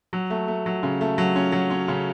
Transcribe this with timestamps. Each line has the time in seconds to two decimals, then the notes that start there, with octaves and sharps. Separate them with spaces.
0.13 F#3
0.30 A3
0.48 A3
0.66 F#3
0.83 C#3
1.01 A3
1.18 F#3
1.36 C#4
1.52 F#3
1.71 C#4
1.88 C#3